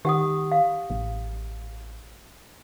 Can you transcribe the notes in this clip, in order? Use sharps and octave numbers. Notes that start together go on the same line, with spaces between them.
D#3 G4 F#5 D#6
F5
A1